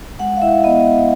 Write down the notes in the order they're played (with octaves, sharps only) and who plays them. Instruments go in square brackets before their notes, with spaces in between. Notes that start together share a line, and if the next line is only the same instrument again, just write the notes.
[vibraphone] G#3 F#5
F5
E4 E5
B3 D#5